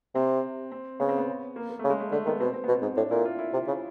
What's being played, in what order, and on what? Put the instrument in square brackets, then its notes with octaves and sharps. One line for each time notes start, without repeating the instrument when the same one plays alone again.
[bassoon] C3 [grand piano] C4
[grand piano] C4
[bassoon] C#3 [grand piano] B3
[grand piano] C4
B3
A#3
A#3
A3
[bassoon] C#3
[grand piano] G#3
A3
[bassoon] D3 [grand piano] A3
[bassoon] D#3 [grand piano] B3
[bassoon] B2 [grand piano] C4
[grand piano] C4
[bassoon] B2 [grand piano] B3
[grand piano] C4
[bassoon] G#2
[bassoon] A2 [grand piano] D4
[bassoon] A#2 [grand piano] E4
[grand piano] F4
E4
[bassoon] C3
C#3